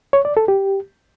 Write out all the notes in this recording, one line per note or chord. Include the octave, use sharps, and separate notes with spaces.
C#5
D5
A4
G4